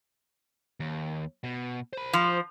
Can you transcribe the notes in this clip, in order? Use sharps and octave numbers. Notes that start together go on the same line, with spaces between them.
D#2
B2
C5 B5
F3